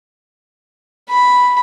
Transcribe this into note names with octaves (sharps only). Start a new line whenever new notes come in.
B5